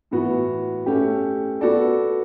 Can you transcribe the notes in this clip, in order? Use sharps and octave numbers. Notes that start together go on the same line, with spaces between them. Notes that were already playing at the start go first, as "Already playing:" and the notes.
A2 E3 B3 F#4
A3 C#4 G4
B3 F#4 A4 D5